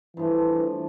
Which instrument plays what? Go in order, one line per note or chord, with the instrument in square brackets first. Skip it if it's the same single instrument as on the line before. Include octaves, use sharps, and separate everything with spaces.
[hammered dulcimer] G2 F3 A3 [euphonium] E3